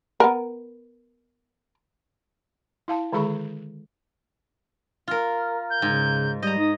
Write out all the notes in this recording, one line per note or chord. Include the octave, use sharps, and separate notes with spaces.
B3 A#4
E4 F5 A5
D3 D#3 G#3 G#4 B5 C#6
F4 A#4
G6
G#2 C#3
G3 D#5 A#5 G6
D#4 D#6